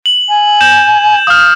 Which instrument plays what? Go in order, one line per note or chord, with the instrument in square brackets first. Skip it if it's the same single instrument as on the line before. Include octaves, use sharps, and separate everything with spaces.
[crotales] F#7
[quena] G#5
[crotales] G6 E7
[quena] F5 [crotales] D#6 F6